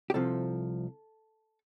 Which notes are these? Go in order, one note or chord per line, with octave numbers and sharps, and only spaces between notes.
G4
C2 C3 F3 A4